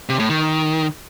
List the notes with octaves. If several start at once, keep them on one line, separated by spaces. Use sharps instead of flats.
C3
A2
D#3